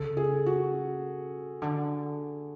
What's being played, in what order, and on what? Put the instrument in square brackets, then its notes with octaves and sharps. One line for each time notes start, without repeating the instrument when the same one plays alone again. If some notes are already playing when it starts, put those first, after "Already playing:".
Already playing: [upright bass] C#3 [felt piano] A4
[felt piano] G#4
F#4
[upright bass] D3